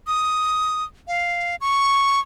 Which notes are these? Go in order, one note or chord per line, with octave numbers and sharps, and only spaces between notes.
D#6
F5
C#6